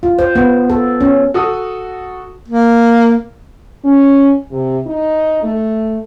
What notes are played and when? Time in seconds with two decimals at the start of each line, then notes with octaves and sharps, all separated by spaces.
0.03 F4
0.19 C5
0.36 B3
0.70 A4
1.01 C#4
1.34 F#4 A4 D#6
2.48 A#3
3.85 C#4
4.51 C3
4.86 D#4
5.43 A3